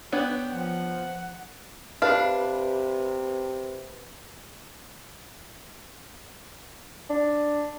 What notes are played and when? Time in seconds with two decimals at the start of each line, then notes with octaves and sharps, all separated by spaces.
0.12 B3 D4 C#5 G5
0.52 F3 F#5
2.02 C3 D4 B4 F5
7.10 D4